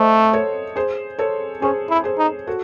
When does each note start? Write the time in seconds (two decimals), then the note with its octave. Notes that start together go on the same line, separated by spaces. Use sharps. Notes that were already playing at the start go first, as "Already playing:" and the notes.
Already playing: A3 C5 D#5 E5 F#5
0.33 A4 C#5
0.76 G#4 C5
1.19 A4 C#5
1.62 C#4 G#4 C5
1.90 E4
2.04 G#4 C5
2.18 D#4
2.47 F#4 A4